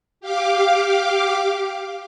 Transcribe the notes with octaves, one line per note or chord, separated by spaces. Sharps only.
G4 F5 D6